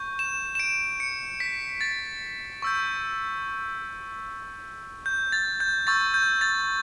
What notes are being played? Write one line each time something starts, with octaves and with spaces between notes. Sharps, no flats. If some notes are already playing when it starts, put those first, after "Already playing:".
Already playing: C#6 G6
E7
E7
D7
C#7
B6
A6
C#6 E6 G6
G6
A6
G6
C#6 E6 G6 A6
G6
A6